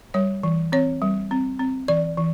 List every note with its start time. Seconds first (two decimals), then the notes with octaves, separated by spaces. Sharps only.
0.14 G3 C#5
0.43 E3
0.72 C4 C#5
1.02 G3
1.31 C4
1.59 C4
1.88 E3 D5
2.17 E3